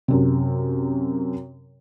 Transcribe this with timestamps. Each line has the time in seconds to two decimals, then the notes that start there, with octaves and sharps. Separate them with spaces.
0.08 F#2 C3